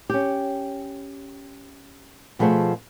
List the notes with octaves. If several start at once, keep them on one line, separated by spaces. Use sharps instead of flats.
C#4 G4
B2 F3 A3 G#4 C5 F#5